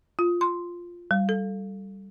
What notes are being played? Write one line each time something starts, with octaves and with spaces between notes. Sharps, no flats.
F4
C6
G3
A4